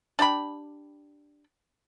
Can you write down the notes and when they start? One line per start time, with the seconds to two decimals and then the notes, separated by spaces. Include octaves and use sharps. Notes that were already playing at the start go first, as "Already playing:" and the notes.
0.19 D4 G4 G5 B5